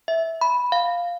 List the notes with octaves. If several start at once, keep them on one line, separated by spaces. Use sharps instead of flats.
E5
B5
F5